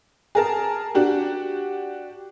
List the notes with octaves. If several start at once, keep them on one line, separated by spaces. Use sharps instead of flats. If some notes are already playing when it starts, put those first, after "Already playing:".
G#4 A#4 A5
D4 F#4 G4